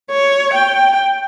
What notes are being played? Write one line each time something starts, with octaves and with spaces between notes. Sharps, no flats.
C#5
G5